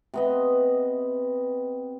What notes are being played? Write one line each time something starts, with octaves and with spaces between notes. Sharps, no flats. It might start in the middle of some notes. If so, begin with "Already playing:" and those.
C3 B3 D#5